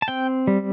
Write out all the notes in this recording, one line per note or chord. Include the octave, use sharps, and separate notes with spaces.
A5
C4 G5
G3